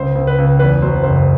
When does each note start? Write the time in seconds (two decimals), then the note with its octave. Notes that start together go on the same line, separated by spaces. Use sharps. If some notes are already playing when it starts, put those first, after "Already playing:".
Already playing: C#2 C5
0.15 C#2
0.27 B4
0.38 C#2
0.59 E2 B4
0.82 F#3 C5
1.03 F#1 C5